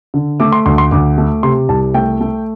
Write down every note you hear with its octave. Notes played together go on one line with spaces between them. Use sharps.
D3
A3 D6
C6
D2 C6
C6
D2 D6
A3
C3 C6
C2 A5
A3 G5
A3